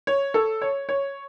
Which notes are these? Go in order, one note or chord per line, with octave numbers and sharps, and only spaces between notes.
C#5
A4
C#5
C#5